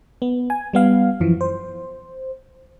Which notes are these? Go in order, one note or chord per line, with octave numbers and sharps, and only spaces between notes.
B3
G#5
G3 B3 F5
F#2 E3 F3
C5